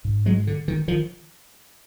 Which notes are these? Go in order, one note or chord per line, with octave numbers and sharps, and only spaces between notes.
G#2
F#3 G#3
D3
D#3
D#3 F3